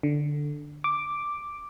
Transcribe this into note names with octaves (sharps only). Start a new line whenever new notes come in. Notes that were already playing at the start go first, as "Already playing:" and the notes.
D3
D6